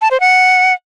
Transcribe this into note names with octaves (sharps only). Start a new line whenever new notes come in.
A5
C5
F#5